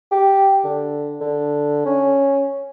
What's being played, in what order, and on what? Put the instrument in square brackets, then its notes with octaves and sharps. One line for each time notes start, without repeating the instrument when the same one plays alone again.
[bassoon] G4
D3
D3
C#4